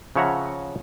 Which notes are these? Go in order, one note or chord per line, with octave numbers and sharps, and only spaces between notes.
C#3 F3 C#5 E5 F#5 A#5